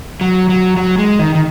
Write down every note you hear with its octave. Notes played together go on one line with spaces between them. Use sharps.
F#3
F#3
F#3
G#3
D#3
D#3